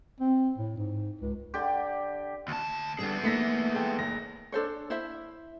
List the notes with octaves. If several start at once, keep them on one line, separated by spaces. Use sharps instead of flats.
C4
A2
G#2
C#2
D3 G4
D2 A5
D3 G3 B3 D4 G#4
A3 A#3 D#4 A#6 B6 C#7
G#3 A4 G5
F#1 A#6
D4 A4 C5 C#5
E4 C5 E5